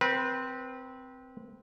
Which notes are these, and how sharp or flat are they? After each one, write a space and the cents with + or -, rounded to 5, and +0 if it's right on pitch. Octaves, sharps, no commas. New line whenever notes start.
C4 -10 B4 -30